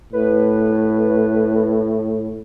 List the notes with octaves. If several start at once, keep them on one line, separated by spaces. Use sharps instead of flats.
A2 B4